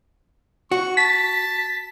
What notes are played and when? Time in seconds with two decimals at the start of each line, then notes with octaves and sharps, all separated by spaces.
0.71 F#4 C#6
0.97 A5 B6